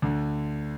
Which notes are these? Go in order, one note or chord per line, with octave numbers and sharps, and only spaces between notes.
D2 D3